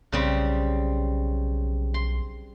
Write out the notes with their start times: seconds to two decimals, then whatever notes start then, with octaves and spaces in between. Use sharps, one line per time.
0.12 B1 C#3 G3 C4
1.94 C6